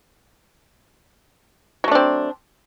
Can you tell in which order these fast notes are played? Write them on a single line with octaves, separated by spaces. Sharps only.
F#3 A3 D4 C4